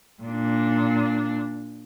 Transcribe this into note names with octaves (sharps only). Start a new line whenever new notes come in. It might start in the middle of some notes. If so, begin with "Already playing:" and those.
A#2 D4